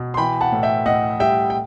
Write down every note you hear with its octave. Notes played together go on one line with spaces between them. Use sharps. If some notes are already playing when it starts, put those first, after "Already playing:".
Already playing: B2
C6
E3 G5 B5
F#5 A5
A2
E5 G5
A2 D#5 F#5
G3 E5 G5
G5